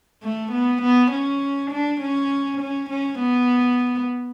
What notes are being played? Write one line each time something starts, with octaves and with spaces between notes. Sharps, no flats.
A3
B3
B3
C#4
D4
C#4
C#4
C#4
B3